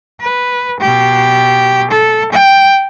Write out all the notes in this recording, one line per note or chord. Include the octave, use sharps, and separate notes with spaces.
B4
B2 G4
A4
G5